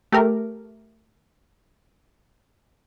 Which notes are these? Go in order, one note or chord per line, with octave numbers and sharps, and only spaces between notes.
A3 G4 A#4